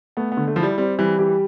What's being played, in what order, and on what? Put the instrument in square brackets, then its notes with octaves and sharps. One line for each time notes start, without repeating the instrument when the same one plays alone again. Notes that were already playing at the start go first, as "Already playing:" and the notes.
[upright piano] A3 [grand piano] B3
[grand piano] B3
[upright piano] D3
[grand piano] A3
[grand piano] F3 [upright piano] E4
[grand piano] G3
[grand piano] G3 [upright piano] C4
[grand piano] E3 [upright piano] G3
[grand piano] E3 [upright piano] G4